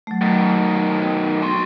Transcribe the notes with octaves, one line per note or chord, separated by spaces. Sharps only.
F#3 A3
B2 D#3
F#4 C6